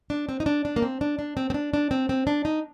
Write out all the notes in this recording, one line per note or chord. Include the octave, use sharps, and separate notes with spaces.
D4
C4
D#4
D4
D4
A#3
C4
D4
D4
C4
C4
D4
D4
C4
C4
D4
D#4